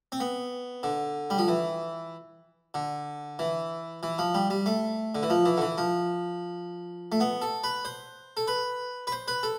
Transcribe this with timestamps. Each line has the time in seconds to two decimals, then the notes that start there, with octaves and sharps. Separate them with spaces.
0.12 C4
0.20 B3
0.83 D3
1.30 G3
1.38 F3
1.48 E3
2.74 D3
3.39 E3
4.03 E3
4.19 F3
4.34 G3
4.50 G3
4.66 A3
5.15 D3
5.23 E3
5.30 F3
5.45 E3
5.57 D3
5.61 E3
5.78 F3
7.12 A3
7.20 B3
7.42 A4
7.64 B4
7.85 C5
8.37 A4
8.47 B4
9.07 B4
9.12 C5
9.28 B4
9.43 A4